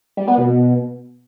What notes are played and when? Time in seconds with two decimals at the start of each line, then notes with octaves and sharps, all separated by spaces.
0.17 G3
0.28 B3
0.38 B2